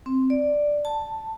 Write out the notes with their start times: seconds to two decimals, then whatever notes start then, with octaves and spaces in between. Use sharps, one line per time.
0.06 C4
0.30 D5
0.85 A5